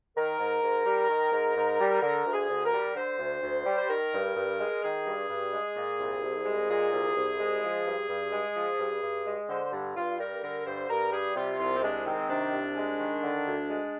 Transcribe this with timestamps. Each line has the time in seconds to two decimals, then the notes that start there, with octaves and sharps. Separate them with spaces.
0.16 D#3 A#4
0.39 G#2
0.62 G#2
0.86 G3
1.09 D#3
1.32 G#2
1.56 G#2
1.79 G3
2.02 D3 A#4
2.26 D2
2.33 G#4
2.49 D2
2.65 A#4
2.72 G3
2.95 D3 C5
3.19 D2
3.42 D2
3.65 G3
3.77 C5
3.88 D#3 A#4
4.13 G2
4.35 G2
4.59 G#3
4.82 D#3 G#4
5.05 G2
5.29 G2
5.52 G#3
5.76 A#2
5.98 C2
6.22 C2
6.45 G#3
6.69 A#2 G#4
6.92 C2
7.16 C2
7.39 G#3
7.63 F3
7.86 G2
8.09 G2
8.32 G#3
8.56 F3
8.79 G2
9.02 G2
9.26 G#3
9.49 D3 C5
9.72 G2
9.95 G2 F4
10.19 G3 A#4
10.42 D3 A#4
10.65 G2 C5
10.88 G2 A#4
11.12 G3 G#4
11.36 C3 F4
11.58 C2 F4
11.76 C4
11.82 G#3 D4
12.05 D#3 C4
12.29 C3 D4
12.52 C2
12.76 G#3
12.99 D#3
13.23 D3
13.46 D2
13.68 G#3